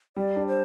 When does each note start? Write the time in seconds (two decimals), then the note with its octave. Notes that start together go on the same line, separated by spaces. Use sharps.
0.16 G3 D5
0.36 D4
0.47 C5